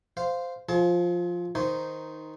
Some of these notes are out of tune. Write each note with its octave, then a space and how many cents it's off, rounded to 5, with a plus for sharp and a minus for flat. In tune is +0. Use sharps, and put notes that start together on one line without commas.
C5 -10 F5 +0
F3 +5 G#4 +40 A5 +0
D#3 +10 D#4 +0 C5 -10